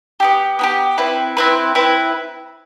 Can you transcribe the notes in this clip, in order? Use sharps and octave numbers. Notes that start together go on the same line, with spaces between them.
B3 E4 G4
B3 E4 G4
C4 E4 B4
C4 E4 B4
C4 E4 B4